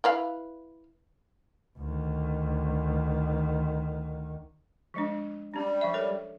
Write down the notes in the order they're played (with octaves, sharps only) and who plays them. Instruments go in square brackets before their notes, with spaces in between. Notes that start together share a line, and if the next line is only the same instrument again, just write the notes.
[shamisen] E4 B4 F5
[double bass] D2 D#3
[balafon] F3 G#3 D4
[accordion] G3 [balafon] C#4 D4
[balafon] F3 E5
A4 A#4 C#5